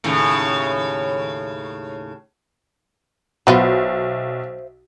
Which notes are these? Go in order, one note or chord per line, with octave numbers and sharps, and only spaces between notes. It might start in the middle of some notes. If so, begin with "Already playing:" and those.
D#2 A2 C#3
B1 F#3 B3 F4 C5 E5 F5